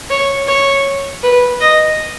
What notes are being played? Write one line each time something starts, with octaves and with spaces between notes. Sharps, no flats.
C#5
C#5
B4
D#5